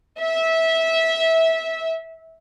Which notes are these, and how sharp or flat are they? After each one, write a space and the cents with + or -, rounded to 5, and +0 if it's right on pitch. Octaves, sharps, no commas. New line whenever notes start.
E5 -20